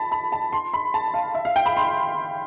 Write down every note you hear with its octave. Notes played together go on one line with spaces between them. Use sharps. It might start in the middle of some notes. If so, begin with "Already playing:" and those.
Already playing: A5 B5
B5
A5
C6
B5
A5
F5
E5
F5
G5
B5
C6